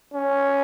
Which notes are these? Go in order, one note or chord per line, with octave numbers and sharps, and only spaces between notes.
C#4